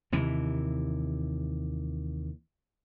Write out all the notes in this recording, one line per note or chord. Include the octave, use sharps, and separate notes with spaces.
D#2 C3 E3